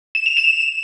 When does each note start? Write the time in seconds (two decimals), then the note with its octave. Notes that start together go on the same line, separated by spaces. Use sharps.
0.15 E7
0.26 F7
0.37 E7